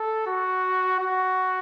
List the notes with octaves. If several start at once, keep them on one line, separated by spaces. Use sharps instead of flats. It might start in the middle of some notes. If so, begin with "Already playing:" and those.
Already playing: A4
F#4
F#4